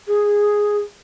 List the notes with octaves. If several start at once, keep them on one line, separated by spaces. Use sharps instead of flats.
G#4